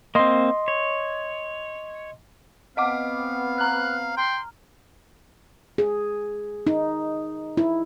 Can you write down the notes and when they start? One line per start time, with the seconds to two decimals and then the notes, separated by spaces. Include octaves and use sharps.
0.15 A#3 C4 D#5 C6
0.68 C#5
2.77 B3 C4 D#5 F5 F#5 D6
3.58 A#5 F6 F#6
4.17 G5 C6
5.78 G#4
6.67 D#4
7.57 E4